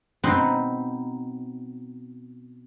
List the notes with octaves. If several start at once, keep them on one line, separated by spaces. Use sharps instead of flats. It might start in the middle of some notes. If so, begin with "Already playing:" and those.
B2 C4 D#4 B4 C6